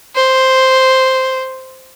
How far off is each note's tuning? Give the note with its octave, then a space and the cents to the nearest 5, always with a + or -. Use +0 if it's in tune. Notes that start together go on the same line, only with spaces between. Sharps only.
C5 +0